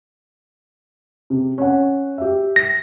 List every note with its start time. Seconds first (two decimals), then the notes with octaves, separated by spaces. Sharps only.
1.30 C3
1.58 C#4 F#5
2.18 G4 E5
2.56 A#6